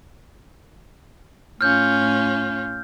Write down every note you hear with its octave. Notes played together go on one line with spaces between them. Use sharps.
A2 C#4 F4 F6 G6